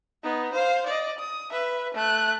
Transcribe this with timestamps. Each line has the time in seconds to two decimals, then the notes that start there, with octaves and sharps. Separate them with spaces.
0.23 B3 D#4
0.53 C5 F5
0.87 D5 D#5
1.19 D#6
1.52 B4 E5
1.95 A3 F#6